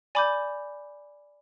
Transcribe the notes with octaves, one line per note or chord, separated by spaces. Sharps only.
D5 G#5 B5 D6 G6